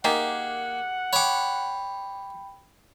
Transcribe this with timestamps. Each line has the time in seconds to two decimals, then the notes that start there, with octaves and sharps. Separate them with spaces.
0.04 D#3 A#3 G4 G#4 F#5
1.13 C#5 G5 B5 D6